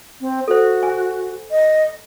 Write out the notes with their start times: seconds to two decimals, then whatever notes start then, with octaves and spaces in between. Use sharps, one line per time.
0.21 C4
0.48 F#4 A4 C5
0.83 G#5
1.51 D#5